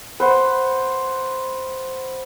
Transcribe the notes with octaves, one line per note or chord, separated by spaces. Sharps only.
B4 C5 F#5